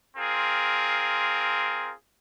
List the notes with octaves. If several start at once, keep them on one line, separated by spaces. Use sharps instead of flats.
C4 F4 G#4 A#4